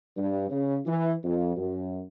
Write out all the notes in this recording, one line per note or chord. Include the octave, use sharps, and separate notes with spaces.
G2
C#3
E3
F2
F#2